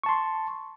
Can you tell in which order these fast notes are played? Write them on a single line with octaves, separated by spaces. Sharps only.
C#6 A5 C6